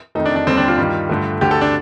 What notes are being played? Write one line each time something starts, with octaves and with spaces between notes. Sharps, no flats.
F2 D#3 A3 D#4
D4
D4
D#2 D3 G3 C4
D4
F4
G2 D#3 G3
G2 D3 A3
D2 D3 A3 G4
A4
D4